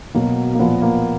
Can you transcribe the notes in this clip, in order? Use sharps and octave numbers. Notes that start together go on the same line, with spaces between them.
B2 F#3 A#3
A#3
A#2 F3 B3
A#3